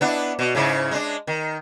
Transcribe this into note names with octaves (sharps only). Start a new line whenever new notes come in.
B3 D4 E4
B2
G#2 C#3 E4
G#3 D4
D#3